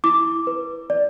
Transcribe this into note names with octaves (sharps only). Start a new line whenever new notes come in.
E4 D6
B4
D5